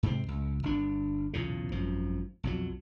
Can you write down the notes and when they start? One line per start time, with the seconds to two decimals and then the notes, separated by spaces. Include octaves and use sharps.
0.03 G#2 C3 A#3 C4
0.28 C#2
0.63 G1 D4
1.33 B1 E2 A#2 C#3
1.72 G#1 F#2 F3
2.43 B1 F2 F#3